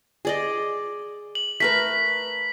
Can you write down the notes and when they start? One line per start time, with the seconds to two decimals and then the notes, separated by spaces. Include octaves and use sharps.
0.25 G#4 D5 D#5
1.35 F#7
1.60 A3 A#4 B4 B6